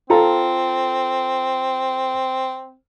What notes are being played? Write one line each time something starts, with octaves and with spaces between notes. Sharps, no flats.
C4 F4 A4 A#5